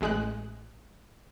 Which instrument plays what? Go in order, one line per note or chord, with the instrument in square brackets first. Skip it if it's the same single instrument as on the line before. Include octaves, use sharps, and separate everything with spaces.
[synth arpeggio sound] A1 G#3 F#6